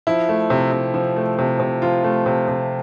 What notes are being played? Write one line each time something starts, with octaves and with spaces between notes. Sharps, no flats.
F3 E4
A3
C3
C3
F3
A3
C3
C3
F3 F4
A3
C3
C3